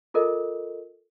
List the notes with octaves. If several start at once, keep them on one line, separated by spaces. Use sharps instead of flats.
F4 A4 A#4 D#5